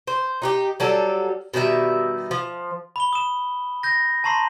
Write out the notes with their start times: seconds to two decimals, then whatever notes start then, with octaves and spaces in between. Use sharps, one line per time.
0.07 C5
0.42 D#4 F#4 G4
0.80 F#3 G3 A4
1.54 B2 D#3 G3 E5
2.31 F3
2.96 B5 G7
3.13 D#6 E7
3.83 G6 A#6
4.24 A5 A#5 C6 C#6 C7